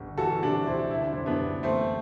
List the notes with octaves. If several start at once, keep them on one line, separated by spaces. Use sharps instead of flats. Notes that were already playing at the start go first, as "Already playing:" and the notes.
Already playing: G1
E3 F#4 A4
C3 D4 F#4
D2 C4 E4
D3 E4
D4
F#2 C4 E4
B3 D4
G1
E3 A3 C4